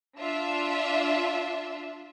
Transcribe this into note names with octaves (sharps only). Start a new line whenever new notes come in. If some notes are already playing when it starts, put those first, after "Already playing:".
D4 F4 E5